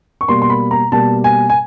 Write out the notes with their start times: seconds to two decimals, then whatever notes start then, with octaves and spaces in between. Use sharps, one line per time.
0.21 C#6
0.28 B2 G3 A#3 C6
0.42 C6
0.50 B5
0.71 A#5
0.92 B2 G3 A#3 A5
1.24 G#5
1.49 G#5